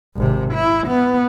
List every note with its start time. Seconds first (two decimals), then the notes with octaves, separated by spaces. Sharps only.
0.16 G#1 C3
0.54 E4
0.88 B3